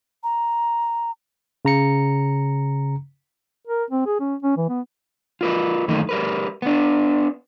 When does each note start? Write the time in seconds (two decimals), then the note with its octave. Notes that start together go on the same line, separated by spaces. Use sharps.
0.23 A#5
1.65 C#3 A#5 C#7
3.67 A#4
3.90 C4
4.06 G#4
4.20 C#4
4.43 C#4
4.57 E3
4.69 B3
5.41 F4 A#4 B4
5.88 F#2 D#3 E3 A3 A#3 D#4
6.09 G3 A#4 B4
6.62 B3 D4